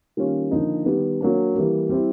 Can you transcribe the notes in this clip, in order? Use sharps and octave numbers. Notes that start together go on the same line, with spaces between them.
D#3 G3 A#3 C#4 F4
D3 F3 A#3 D#4
D#3 G3 B3
F#3 A#3 D4
E3 G3 A#3
G3 C4 E4